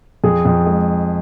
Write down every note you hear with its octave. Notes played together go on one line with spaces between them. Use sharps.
F2 G#4
F2
G#3